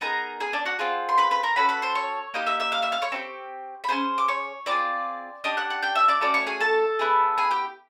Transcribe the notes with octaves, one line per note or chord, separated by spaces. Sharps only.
B3 D#4 G#4 A#4 A#5
G#4 G#5
D4 D5
F#4 F#5
C4 F4 G#4
C6
B4 B5
B4 B5
A#4 A#5
C#4 F#4 A4 B4 B5
B4 B5
C5 C6
C#5 C#6
A#3 D#4 G4 D#5 D#6
E5 E6
E5 E6
F5 F6
E5 E6
F5 F6
C#5 C#6
C4 D#4 G4
B5
C#4 F4 G#4 C5 C6
D6
C#5 C#6
C4 F4 G#4 D5 D6
D4 G4 D#5 D#6
F#5 F#6
F#5 F#6
G5 G6
E5 E6
D5 D6
A3 C#4 F#4 D5 D6
C#5 C#6
G#4 G#5
A4 A5
B3 E4 G#4
G#4 G#5
G4 G5